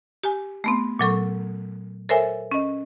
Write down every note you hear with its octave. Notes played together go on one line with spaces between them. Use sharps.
G4 G#5
A3 B3 C4
A#2 F#3 A4 C#6
A4 A#4 C5 C#5 E5 G#5
C#4 D#5